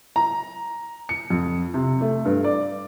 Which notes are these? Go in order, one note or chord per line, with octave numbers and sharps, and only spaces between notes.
A#5
C#7
F2
C3
A3
G2
D5